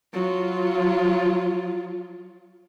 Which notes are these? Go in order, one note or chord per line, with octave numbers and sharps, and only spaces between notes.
F#3 F4